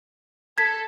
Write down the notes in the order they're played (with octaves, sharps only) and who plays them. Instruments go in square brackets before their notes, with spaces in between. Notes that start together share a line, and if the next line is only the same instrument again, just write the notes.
[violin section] A4 [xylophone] G#6 B6